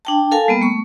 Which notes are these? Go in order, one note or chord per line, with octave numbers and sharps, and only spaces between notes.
D4 G5 A5
A4 A#4 F5 G#5 A5
G3 A#3 B3
A3 C#6